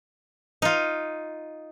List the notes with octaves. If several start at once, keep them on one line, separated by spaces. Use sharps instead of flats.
D#4 F4